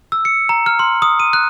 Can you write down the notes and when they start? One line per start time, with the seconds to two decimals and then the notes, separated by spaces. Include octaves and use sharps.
0.12 E6
0.25 C#7
0.49 A#5
0.66 F6
0.79 C6
1.02 D#6
1.20 D#7
1.33 F#6